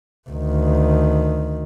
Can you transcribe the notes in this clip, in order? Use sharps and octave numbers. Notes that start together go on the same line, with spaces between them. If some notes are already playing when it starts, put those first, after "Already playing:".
D2 D#3